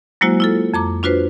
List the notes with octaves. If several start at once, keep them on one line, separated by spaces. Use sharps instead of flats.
F#3 G#3 A#3 E4 F#4 C5
E4 F4 A4
F2 A#5 D6
D4 F4 F#4 B4 C5